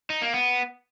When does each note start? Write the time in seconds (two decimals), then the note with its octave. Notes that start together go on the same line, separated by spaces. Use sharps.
0.10 D#4
0.22 A#3
0.34 B3